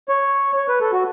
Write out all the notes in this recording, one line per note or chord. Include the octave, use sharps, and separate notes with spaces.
C#5
C#5
B4
A4
F#4